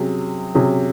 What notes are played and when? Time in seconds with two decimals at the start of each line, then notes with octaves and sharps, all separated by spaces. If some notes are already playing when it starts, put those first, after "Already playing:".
Already playing: C3 F#3 C#4 G#4
0.55 C3 F#3 C#4 G#4